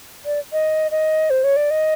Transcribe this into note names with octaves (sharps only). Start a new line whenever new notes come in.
D5
D#5
D#5
C5
C#5
D5
D#5